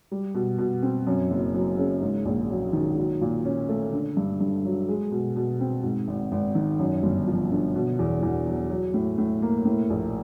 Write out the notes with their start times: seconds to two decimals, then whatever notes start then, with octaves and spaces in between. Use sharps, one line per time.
0.11 G3
0.34 B2
0.58 B2
0.83 C4
1.07 F#2
1.30 F#1
1.54 F#3
1.78 C#3
2.02 G#2
2.25 A#1
2.50 F#3
2.73 D#3
2.98 F#3
3.21 A#2
3.45 C#4
3.69 A3
3.92 D3
4.17 G2
4.40 G2
4.65 F#3
4.88 G#3
5.12 B2
5.36 B2
5.60 C4
5.83 G#2
6.08 G#1
6.32 G#1
6.55 D#3
6.79 F#2
7.03 G1
7.27 F3
7.51 D3
7.75 B2
7.99 E2
8.22 E2
8.47 F#3
8.70 F#3
8.94 A2
9.18 A2
9.42 A#3
9.65 A2
9.90 A#1